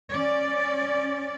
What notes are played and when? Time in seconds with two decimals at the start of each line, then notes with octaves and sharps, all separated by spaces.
0.12 C#4 D5